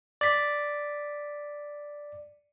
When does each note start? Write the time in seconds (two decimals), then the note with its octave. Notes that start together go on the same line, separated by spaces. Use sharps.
0.21 D5 B6